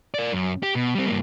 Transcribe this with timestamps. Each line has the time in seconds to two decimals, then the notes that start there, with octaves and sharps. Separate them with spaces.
0.14 A#4 D5
0.33 F#2
0.63 G4
0.75 B2
0.95 G3 C4
1.07 G2 A#3